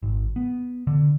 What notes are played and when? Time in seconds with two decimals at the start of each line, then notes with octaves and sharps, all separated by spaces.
0.03 G#1
0.36 B3
0.87 D3